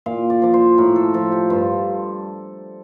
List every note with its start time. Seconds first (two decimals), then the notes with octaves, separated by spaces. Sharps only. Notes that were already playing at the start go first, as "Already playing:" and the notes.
0.06 A#2 F5
0.30 D5
0.42 F3 D5
0.54 C5
0.78 A2 A#4
0.96 A4
1.14 F3 A4
1.32 G4
1.50 G2 F4